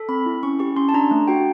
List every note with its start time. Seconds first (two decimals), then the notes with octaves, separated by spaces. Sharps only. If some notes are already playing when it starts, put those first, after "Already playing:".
Already playing: A4
0.09 C4 B5
0.26 E4
0.43 C#4 C#6
0.59 G4 C#6
0.76 C#4 C6
0.89 A5
0.94 D4 A#5
1.11 A3
1.28 F#4 G5